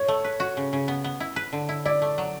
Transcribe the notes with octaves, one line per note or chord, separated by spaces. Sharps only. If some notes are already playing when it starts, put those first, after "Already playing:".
Already playing: A2 C#5
A3
B4
F#4
C#3
C#3
B3
B3
E4
B4
D3
E4
E4 D5
A3
F#3